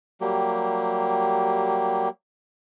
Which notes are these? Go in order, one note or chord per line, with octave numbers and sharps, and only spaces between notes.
F#3 G3 A#3 G4